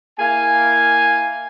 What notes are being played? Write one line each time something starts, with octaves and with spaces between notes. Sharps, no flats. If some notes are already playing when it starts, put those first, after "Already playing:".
A#3 E4 F5 G#5